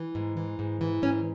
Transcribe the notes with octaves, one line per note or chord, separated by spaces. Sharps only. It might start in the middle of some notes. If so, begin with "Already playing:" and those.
Already playing: E3
G#2
E3
G#2
E3
G#2 C#4